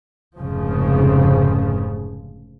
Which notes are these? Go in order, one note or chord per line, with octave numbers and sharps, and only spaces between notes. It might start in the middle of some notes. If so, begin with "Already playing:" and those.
F1 G#2 C#3 F3